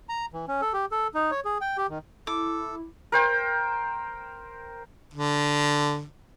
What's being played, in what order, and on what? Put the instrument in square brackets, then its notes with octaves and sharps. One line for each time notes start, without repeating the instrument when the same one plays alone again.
[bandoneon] A#5
E3
C#4
A4
G4
A4
D#4
C#5
G#4
G5
G4
D#3
[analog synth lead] E4 [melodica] A4 [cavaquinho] D6
[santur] A#4 C5 G5
[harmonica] D3